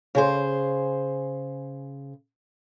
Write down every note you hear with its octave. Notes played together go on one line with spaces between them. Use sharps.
C#3 G#4 C5